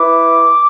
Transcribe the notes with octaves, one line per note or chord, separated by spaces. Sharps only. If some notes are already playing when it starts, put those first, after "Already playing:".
Already playing: E4 B4 D6